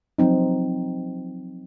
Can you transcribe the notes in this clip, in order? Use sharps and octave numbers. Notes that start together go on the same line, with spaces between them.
F3 F#3 C4 D#4